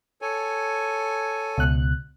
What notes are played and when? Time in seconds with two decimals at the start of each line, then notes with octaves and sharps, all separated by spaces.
0.22 A4 C#5 G#5
1.57 C#2 B2 F#6